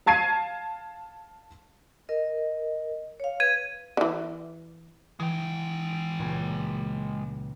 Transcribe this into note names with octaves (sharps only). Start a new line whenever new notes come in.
F5 A5 G#6 C7 D#7
A#4 D#5
C#5 F5
B4 G#6 D#7
D3 E3
E3 G#3 G5
C#2 A#2 B3